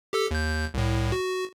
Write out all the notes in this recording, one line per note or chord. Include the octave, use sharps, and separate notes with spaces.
G4 A4 E6
D#2 G6
C2 A2
F#4